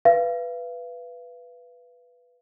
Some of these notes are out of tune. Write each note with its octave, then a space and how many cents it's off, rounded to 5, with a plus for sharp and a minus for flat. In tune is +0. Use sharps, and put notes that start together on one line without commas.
B4 +0 F5 -35